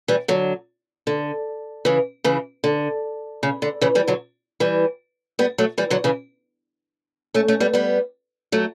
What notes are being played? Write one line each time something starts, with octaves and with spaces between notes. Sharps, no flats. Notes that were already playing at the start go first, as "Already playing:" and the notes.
E3 G3
D3 F#3
D3
C#3 E3
C#3 E3
D3
C#3
D3
C#3 E3
E3 G3
D3 F#3
E3 G3
G3 B3
F#3 A3
E3 G3
D3 F#3
C#3 E3
A3 C#4
A3 C#4
G3 B3
G3 B3
F#3 A3